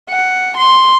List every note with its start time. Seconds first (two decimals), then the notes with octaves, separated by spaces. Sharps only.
0.10 F#5
0.57 C6